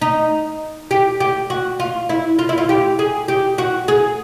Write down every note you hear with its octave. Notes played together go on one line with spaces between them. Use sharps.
D#4
G4
G4
F#4
F4
E4
F4
E4
F4
G4
G#4
G4
F#4
G#4